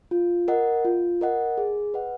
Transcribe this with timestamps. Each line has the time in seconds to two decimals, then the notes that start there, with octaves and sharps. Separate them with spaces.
0.11 F4
0.48 A#4 D#5 F#5
0.85 F4
1.21 A#4 D#5 F#5
1.58 G#4
1.94 B4 D#5 F#5